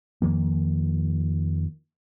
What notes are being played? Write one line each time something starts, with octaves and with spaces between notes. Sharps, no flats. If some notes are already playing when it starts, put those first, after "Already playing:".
F2 D#3 F3 A#3